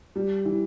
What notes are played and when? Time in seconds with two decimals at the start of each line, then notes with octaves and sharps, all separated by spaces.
0.16 G3
0.45 E3